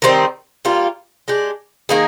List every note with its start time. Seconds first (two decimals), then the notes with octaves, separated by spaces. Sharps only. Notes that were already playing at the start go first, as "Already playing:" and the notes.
0.02 D#3 G3 C4 D#4
0.65 G3 A#3 F4
1.28 G#3 D4 G4
1.89 D#3 A#3 D#4 G#4